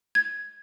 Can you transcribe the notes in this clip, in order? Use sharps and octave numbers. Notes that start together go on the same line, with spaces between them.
G#6